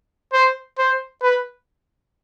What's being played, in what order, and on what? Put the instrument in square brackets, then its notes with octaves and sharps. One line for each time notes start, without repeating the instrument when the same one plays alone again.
[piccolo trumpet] C5
C5
B4